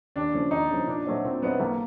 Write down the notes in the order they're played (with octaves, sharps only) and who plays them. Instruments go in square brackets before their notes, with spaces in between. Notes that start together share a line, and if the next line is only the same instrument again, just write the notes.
[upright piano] D#2 [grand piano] D4
[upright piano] C#3 F3
[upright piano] D#2 [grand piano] D#4
[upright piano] C#3 F3
[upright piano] A#2 [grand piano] D4
[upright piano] F#3 A3 C4 D#4
[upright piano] A#2 [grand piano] C4
[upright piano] F#3 A3 C4 D#4 [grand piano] B3
[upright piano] B1 [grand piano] A#3